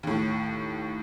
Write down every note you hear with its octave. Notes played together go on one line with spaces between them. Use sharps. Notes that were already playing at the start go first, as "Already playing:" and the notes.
D#2 A2